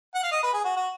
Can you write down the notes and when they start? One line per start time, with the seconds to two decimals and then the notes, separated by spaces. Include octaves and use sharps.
0.15 F#5
0.23 F5
0.32 D#5
0.43 B4
0.54 G#4
0.64 F#4
0.77 F#4